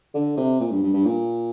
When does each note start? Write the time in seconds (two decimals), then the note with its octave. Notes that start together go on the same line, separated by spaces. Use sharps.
0.14 D3
0.37 C3
0.60 A#2
0.71 G2
0.83 G2
0.93 G2
1.05 A#2